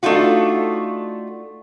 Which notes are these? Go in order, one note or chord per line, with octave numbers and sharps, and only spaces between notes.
A3 D4 D#4 F4 F#4